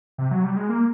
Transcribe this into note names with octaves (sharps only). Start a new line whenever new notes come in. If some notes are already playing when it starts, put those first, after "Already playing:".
C3
F#3
G3
G#3
A#3